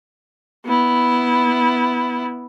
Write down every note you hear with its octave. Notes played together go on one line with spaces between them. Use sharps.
B3 E4